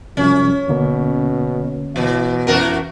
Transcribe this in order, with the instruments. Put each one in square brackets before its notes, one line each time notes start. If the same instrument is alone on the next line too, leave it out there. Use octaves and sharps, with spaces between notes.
[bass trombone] F#2 [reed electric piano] C3 F3 G3 [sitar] C#4
[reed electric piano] D#2 D3 A#3 [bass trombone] B2
[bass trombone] B2 [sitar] E3
[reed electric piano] F2 C#4 [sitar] E3 F#4 A#4